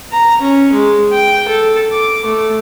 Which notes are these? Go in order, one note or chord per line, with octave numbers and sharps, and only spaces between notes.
A#5
C#4
G#3
G5
A4
D6
A3